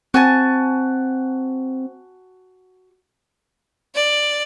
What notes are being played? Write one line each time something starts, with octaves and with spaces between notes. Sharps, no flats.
C4 F#4 G#5 A5
D5